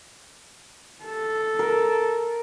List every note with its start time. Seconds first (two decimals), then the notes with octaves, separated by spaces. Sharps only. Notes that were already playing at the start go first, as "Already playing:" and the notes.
1.05 A4
1.59 A#4